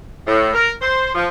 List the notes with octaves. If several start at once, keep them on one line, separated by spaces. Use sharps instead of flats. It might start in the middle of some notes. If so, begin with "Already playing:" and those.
A2
A#4
C5
F3